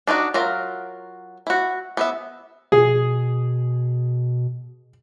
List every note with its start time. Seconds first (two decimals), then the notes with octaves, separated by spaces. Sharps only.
0.07 D4 D#4 F4 F#4
0.34 F#3 F4 A#4 E5
1.47 E4 F#4
1.97 B3 B4 E5
2.72 B2 G#4